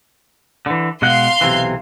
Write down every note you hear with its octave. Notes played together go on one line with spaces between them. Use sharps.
D3 E3
B2 G#3 F5 F#5 C6
B1 C3 E3